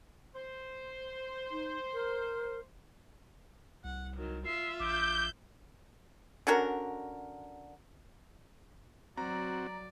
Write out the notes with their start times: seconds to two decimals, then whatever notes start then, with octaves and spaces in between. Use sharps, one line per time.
0.35 C5
1.51 D#4
1.94 A#4
3.84 C2 F#5
4.16 D#3 F#3
4.45 F4 E5 C7
4.80 A#1 D6 G6
6.47 D3 C#4 F#4 A#4
9.17 F#3 C4 F#4 D5 A#5